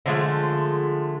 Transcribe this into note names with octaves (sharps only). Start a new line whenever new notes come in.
D3 F3 G#3 A3